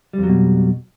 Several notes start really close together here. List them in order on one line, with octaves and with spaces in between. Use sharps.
G3 F2 F#3 B2